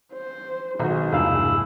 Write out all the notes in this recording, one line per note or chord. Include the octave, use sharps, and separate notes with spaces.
C5
B1 B2 D#3 G#3 F#4 G#4 D#5
A#1 E2 G2 C3 E4 F5